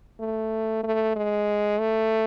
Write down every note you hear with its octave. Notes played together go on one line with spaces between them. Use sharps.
A3
A3
G#3
A3